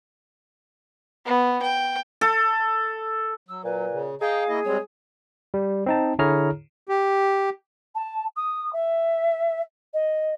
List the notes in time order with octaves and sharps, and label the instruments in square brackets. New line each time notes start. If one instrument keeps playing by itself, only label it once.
[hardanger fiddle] B3
G5
[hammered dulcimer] A4
[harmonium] F#3 [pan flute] E6
[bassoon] A#2 [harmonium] F#3 [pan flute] B4
[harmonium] C#3
[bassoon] G#4 [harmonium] D#5 G5 A#5 [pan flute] F5
[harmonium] A#3 E4 D#5
[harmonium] G3 G#3 C4 [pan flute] C#5
[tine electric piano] G3
C4 D#4 A5
D3 E4 G#4 C#5 A#5 F6
[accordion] G4
[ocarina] A5
D#6
E5
D#5